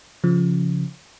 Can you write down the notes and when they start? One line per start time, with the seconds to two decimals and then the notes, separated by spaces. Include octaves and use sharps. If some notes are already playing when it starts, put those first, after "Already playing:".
0.24 C#3 F3